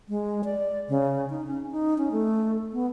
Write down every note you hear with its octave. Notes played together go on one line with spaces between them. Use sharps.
G#3
D5
C#3
D#4
C#4
D#4
C#4
A3
B3